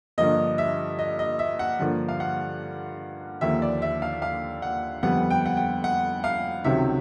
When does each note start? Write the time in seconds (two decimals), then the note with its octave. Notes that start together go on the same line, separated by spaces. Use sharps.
0.18 G2 D3 F3 A#3 D#5
0.58 E5
0.99 D#5
1.19 D#5
1.39 E5
1.59 F#5
1.79 G2 D3 F3 A#3
2.08 F5
2.20 F#5
3.41 D#2 D3 F3 A#3 E5
3.62 D5
3.82 E5
4.02 F5
4.22 F5
4.62 F#5
5.03 F2 D3 G3 B3 F#5
5.30 G5
5.46 F#5
5.57 G5
5.84 F#5
6.24 F5
6.64 C#2 C3 D#3 F#3 E5